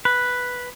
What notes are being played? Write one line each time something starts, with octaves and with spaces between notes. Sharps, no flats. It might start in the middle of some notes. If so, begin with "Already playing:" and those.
B4